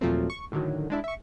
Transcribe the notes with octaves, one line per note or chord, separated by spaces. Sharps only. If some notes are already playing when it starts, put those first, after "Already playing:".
D#2 A#2 F3 F#3 A3 C4
C#6
A2 D3 D#3 F#3
G#3 D4 E4
E5 C#6